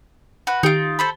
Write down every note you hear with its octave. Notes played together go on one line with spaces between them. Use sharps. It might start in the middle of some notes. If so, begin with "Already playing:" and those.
F#4 B4
D#3 D#4 F4 G4 D7
A4 C5 B5